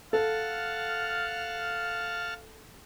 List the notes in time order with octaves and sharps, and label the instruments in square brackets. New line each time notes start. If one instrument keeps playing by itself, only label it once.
[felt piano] A4 [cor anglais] F5 [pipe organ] F#5 A5 F6